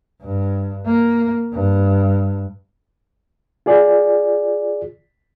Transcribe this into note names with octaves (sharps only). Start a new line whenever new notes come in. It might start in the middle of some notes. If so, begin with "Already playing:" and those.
G2
A#3
G2
F4 G#4 D5